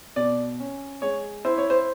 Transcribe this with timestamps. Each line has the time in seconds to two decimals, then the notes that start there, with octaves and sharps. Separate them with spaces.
0.16 B2 D5
0.60 C#4
1.02 G#3 C#5
1.45 E4 C5
1.58 C#5
1.70 C5